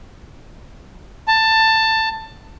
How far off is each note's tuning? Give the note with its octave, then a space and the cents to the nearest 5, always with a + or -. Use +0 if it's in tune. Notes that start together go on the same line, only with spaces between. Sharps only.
A5 +15